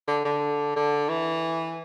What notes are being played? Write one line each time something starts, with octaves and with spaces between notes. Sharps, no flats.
D3
D3
D3
E3